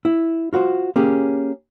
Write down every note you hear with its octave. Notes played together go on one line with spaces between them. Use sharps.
E4
F4 F#4 B4 C5
A#3 C#4 G4 G#4